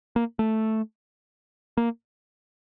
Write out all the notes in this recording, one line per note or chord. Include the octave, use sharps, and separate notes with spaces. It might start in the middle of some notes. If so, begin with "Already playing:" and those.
A#3
A3
A#3